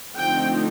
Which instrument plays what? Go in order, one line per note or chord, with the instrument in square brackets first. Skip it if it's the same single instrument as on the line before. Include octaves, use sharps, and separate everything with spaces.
[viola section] D3 F3 A3 C4 D#4 G5